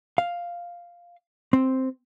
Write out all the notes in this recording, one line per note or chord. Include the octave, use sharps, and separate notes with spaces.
F5
C4